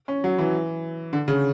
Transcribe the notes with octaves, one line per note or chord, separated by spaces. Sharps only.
C#4
F#3
E3
D3
C#3